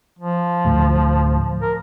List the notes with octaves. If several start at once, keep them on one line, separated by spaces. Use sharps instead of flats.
F3
D2 A2
A#4